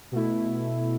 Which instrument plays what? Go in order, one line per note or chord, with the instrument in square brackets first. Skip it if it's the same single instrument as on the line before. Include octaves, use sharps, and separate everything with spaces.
[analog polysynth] B2 A3 E4